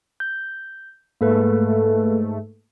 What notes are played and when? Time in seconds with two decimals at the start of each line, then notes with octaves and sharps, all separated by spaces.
0.20 G6
1.21 G#2 A3 A#3 A4 B4